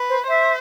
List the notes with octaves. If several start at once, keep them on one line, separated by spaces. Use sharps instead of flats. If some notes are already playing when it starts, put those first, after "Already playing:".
Already playing: B4
C5
C5 E5